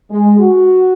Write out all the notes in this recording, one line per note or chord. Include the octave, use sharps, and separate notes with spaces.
G#3
F#4